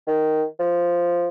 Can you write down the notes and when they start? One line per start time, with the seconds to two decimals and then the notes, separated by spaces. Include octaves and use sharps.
0.07 D#3
0.59 F3